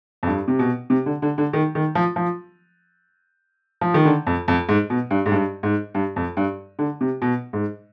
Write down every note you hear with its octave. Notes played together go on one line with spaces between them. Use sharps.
F2
G2
C3
B2
C3
D3
D3
D3
D#3
D#3
F3
F3
F3
D#3
D3
F2
F2
G#2
B2
G2
G#2
G2
G#2
G2
F2
G2
D3
C3
B2
G#2